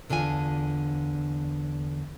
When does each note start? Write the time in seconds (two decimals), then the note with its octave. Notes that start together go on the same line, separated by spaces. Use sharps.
0.10 E2 D3 D4 F4 G#5